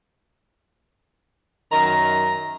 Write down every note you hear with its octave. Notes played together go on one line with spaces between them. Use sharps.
F#2 D#3 A#5